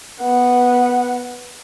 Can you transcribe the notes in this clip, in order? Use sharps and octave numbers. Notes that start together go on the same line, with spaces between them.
B3 F#5